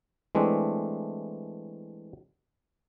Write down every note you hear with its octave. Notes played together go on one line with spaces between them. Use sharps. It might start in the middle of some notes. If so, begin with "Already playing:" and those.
E3 G#3 A3 C4 D4